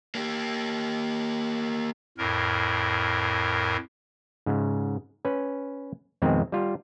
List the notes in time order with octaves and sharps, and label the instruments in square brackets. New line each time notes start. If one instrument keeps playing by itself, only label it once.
[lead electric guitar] A#3 G4
[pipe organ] F2 A2 A#4
[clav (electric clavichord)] G#2 C#3
C#4 B4
F2 B2 D#3 G#3 C4
G3 F4